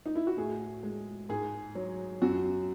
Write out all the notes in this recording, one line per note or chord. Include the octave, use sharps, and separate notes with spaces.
D#4
E4
F#4
A2 G#4
G#3
G#2 G#4
F#3
F#2 F#4